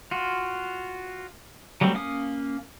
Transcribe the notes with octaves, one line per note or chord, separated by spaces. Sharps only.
F4 F#4
F#3 G3 A3 C4
A#3 C#4 F5 D#6